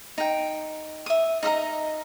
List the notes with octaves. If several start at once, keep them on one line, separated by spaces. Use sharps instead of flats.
D#4 G5
E5 D#6
D#4 D#5 E5 A#5